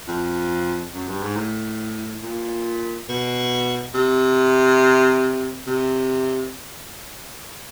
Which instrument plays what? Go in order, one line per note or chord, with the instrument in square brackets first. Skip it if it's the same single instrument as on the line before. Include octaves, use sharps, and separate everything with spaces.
[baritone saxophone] F2
F#2
G2
G#2
A2
A#2
B2
C3
C3